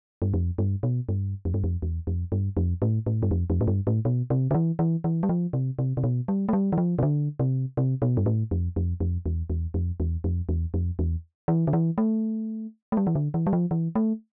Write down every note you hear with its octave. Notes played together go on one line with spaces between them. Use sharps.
G2
F2
G2
B2
G2
F2
G2
F2
E2
F2
G2
F2
A2
A2
G2
F2
F2
A2
G2
A2
B2
C3
D3
E3
E3
E3
G3
F3
C3
C3
C3
B2
G3
A3
G3
E3
F3
C3
D3
C3
C3
B2
G2
A2
F2
F2
F2
E2
E2
F2
E2
F2
E2
F2
E2
E3
D3
E3
A3
A3
G3
E3
D3
E3
G3
F3
E3
A3